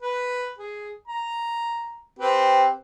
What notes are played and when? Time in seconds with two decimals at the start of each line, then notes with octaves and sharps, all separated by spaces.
0.02 B4
0.58 G#4
1.08 A#5
2.19 C4 G4 B4